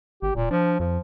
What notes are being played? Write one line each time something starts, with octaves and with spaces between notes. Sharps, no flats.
G#1 G4
D1 A#2
F3 D4
F2 F3